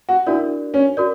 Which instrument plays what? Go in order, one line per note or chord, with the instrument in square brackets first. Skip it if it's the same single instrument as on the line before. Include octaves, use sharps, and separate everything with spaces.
[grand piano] F#4
[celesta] D4 F#4 A#4 D5 [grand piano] E4
[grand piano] C#4
[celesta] F#4 A#4 D5